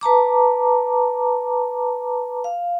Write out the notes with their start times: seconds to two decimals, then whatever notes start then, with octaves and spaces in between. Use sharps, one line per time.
0.01 B4 A5 A#5 D6
2.44 F5